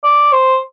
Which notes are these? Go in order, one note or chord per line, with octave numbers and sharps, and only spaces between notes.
D5
C5